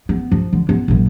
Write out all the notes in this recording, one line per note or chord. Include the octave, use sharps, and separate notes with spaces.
B3
F3
D3
B3
A#1 F#2